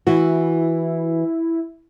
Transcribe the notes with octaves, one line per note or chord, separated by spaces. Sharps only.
E3 E4 F#4